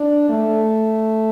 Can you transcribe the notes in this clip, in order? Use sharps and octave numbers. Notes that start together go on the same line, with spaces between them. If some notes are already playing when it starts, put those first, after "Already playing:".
Already playing: D4
A3